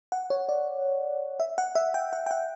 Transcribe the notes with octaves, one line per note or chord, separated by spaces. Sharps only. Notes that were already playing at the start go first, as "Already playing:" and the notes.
F#5
C#5
D5
E5
F#5
E5
G5
F#5
G5
F#5